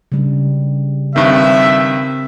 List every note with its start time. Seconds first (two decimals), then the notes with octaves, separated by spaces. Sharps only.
0.12 C#3 G3
1.16 G2 D#3 C4 A#4 E5